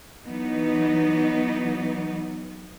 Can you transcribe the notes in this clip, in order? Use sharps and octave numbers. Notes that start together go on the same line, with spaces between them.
E3 F#3 B3 D#4